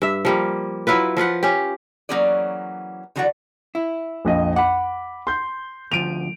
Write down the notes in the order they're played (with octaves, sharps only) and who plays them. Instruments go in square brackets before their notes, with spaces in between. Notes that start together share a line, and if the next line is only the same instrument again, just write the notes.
[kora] G2 E5
F3 G3 A#3
F#3 E4 F4 B4
F3 F4 B4 F#5
C#4 G4
[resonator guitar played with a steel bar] E3 F#3 A#3 C#4 G#4 D5
D3 E3 F#3 F#4 D5 F#5
[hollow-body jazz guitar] E4
[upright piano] A#1 F2 D#5
[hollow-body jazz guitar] F#5 [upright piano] B5 D6
[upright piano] C6 G6
[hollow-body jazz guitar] D2 F3 [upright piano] D7 D#7 F7